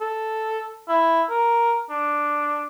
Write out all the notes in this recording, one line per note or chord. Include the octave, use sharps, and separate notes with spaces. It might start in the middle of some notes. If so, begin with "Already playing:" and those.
A4
E4
A#4
D4